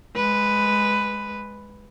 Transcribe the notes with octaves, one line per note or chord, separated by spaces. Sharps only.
G#3 B4